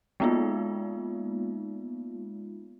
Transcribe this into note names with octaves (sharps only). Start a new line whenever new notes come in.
G#3 A#3 B3 D#4 F4